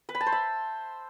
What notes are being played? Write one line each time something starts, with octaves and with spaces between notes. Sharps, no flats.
B4
B5
A5
C5
E5